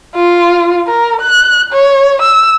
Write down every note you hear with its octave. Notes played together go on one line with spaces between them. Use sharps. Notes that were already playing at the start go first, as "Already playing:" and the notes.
F4
A#4
F#6
C#5
E6